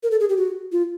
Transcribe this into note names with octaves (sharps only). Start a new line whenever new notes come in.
A#4
A4
G#4
G4
F#4
F4